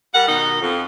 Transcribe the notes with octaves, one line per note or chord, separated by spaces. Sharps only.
G3 A#4 F#5
B2 D#3 D#4
F2